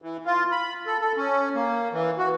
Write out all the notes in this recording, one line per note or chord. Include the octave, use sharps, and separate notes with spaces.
E3
F4
B5
A4
A4
C#4
A#3
E3
F#4